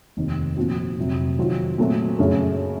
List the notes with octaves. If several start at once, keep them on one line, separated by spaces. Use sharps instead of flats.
F1 D#2 D#3
A#2 F3 C4 F#4
F1 F2 C3 F#3
F2 D#3 F#3 C4 F4
A#2 F#3 A3 C4 F#4
F#2 C#3 A3